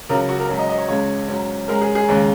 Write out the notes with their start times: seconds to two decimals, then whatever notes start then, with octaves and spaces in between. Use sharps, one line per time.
0.09 C#2 C#3 F#3 A#4
0.29 F#4
0.40 A#4
0.49 G#2 F#3 C#4
0.59 D#5
0.69 D#5
0.78 C#5
0.88 C#2 C#3 G#3 C#5
1.28 G#2 F#3 C#4
1.68 G#2 G#3 C#4 A#4
1.81 G#4
1.95 G#4
2.08 D#2 C#3 G#3 C#4